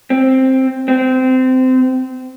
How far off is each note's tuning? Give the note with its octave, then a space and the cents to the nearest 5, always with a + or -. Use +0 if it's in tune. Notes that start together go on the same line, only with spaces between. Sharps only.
C4 +5
C4 -20